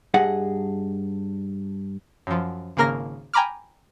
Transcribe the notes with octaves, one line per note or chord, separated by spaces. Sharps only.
G2 G#4 D#5 F#5
F#2 F3
G#1 C#3 A#3 A#4 F6 A#6
G5 G#5 A#5 B5 D6 F6